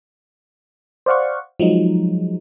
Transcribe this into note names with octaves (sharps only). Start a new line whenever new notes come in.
C5 D5 F5 F#5 C#6
F3 F#3 G#3 D#4